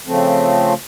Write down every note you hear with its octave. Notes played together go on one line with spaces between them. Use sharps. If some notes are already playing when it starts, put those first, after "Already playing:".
C#3 F3 A3 C4